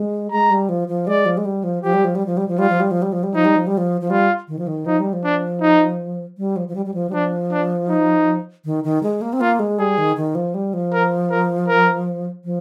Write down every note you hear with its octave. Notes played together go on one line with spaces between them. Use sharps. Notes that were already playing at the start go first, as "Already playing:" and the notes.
Already playing: G#3
G#3 A#5
G3
F3
F3
G#3 D5
F3
G#3
G3
F3
F3 G4
G3
F3
G3
F3
G3
F3
G3 F4
F3
G3
F3
G3
F3
G3
F3 D#4
G3
F3
G3
F3
F3
G3 F4
D#3
F3
D#3
F3 D#4
G3
F3
D4
D#4
G3
F3
F3
G3
G3
F3
G3
F3 D4
D4
D#4
D#3
D#3
G#3
A#3
C4
A#3 F4
G#3
G3 G#4
D#3
D#3
F3
G3
F3
A#4
A#4
A#4
F3